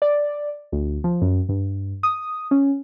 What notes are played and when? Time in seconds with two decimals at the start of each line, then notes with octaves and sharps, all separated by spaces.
0.02 D5
0.72 D2
1.04 F3
1.22 F#2
1.49 G2
2.03 D#6
2.51 C#4